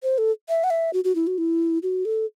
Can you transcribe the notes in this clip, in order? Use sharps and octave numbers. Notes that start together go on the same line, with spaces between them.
C5
A4
E5
F#5
E5
F#4
F#4
E4
F#4
E4
F#4
A4